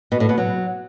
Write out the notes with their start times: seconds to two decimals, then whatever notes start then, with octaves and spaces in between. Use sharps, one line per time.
0.12 B2
0.20 A2
0.29 B2
0.38 F#3